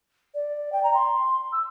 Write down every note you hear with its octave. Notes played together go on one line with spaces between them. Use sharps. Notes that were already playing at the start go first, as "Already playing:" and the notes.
D5
G5
A#5
C6
E6